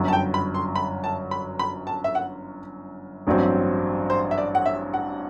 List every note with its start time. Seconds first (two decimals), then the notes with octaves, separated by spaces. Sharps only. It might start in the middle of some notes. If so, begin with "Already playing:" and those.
Already playing: G1 F#2 F#3
0.08 A5
0.13 G5
0.34 B5
0.54 C6
0.76 B5
1.04 A5
1.31 B5
1.59 B5
1.87 A5
2.04 E5
2.15 F#5
3.27 A1 G2 F#3 C4
4.10 C5
4.31 E5
4.38 D5
4.55 F#5
4.66 E5
4.94 F#5